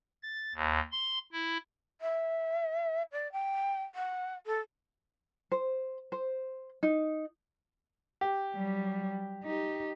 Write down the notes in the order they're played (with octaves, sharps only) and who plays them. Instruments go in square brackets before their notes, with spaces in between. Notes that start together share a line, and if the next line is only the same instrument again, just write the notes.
[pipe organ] A6
D#2
C6
E4
[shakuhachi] E5
D5
G5
F#5
A4
[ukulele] C5
C5
D#4
[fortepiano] G4
[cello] F#3 G3
D#4 G4